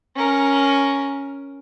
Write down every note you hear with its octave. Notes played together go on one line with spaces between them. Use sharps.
C#4 A#4